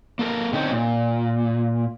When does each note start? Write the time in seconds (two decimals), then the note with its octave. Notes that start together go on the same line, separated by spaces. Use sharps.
0.19 A#3 A4 A#4
0.53 D3 C4 C#4 D#4 C5
0.71 A#2